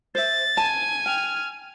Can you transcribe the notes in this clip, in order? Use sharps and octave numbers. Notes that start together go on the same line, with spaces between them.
C5 E5 A6
G#5 A5
G5 F6